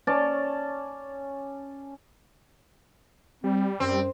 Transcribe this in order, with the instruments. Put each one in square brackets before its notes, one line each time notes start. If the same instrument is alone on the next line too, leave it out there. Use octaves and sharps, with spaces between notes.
[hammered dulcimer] C#4 C#5 D5 A5
[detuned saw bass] G3 [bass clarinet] C4
[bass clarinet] F#2 [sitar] C4